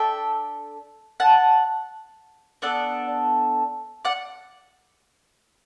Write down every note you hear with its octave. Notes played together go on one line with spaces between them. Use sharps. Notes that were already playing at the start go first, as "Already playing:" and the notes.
Already playing: D4 A4 E5 G5
F#5 A5
B3 D4 A4 D5 F#5
D5 F#5